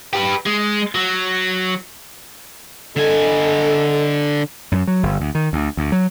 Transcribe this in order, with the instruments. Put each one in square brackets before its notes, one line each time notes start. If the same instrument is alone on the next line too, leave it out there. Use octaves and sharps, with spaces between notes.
[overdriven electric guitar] G4 B4
G#3
F#3
[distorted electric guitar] D3 G#5 [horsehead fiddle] A4 D#5
[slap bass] F#2
F#3
G1
D2
D#3
D2
D2
F#3